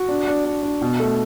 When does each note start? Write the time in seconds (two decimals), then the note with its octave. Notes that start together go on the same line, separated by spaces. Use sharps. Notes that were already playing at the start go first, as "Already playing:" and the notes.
Already playing: F#4
0.09 D4
0.27 D4
0.45 D4
0.63 D4
0.82 B2
1.00 A3